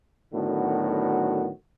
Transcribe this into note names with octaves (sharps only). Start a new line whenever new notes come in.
A2 D3 D#3 F#3 B3 F#4